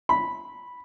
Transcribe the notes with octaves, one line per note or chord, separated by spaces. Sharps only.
B5